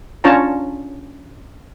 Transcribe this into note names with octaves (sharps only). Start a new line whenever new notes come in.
C#4 D4 F4 C#5 A5 A#5